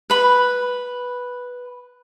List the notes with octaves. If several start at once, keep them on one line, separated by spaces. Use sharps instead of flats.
B4 B5